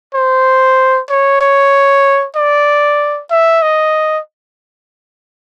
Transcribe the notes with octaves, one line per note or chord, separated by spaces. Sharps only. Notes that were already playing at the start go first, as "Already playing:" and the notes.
C5
C#5
C#5
D5
E5
D#5